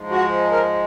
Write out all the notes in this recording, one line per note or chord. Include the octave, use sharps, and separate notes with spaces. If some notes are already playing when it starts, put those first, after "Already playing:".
Already playing: G#2 F3 G#3
F#4
A#4